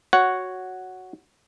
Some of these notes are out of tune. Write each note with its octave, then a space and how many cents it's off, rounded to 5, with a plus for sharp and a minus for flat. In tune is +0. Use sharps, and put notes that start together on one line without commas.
F#4 +0 C#5 +0 F#5 +0